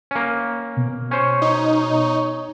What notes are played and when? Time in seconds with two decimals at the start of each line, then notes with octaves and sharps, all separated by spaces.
0.11 A#3 C#4
0.77 B2
1.11 C#4 C5 C#5
1.42 D#4
1.75 C#5